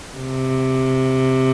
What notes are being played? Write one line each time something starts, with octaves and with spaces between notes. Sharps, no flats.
C3